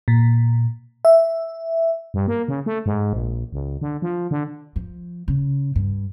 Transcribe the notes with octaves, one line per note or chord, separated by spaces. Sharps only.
A#2
E5
G2
A#3
C#3
A3
G#2
A#1
C#2
D3
F3
D3
F3
C#3
G2